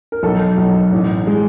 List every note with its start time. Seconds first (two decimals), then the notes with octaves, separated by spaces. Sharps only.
0.12 A#4
0.23 B1 A4
0.58 B1
0.92 A1
1.27 G#3